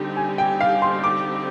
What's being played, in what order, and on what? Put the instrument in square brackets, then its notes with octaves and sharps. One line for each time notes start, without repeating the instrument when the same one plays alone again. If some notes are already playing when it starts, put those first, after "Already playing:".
Already playing: [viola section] D3 G3 C4 D#4 G4
[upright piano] G#5
G5
F5
C6
D6